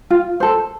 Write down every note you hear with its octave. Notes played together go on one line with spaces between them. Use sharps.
F4
A4 C5